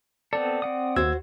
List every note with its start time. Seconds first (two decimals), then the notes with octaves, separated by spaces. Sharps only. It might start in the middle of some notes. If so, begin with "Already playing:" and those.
0.33 B3 C4 A4 D5
0.62 C4 F#5 D#6
0.96 D#2 F#4 C5 E6 G#6